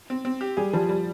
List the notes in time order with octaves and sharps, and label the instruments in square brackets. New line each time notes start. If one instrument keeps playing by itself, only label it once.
[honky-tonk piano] C4
C4
G4
[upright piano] G3 [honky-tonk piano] G#4
[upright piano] F3 [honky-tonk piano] G3
[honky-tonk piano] G3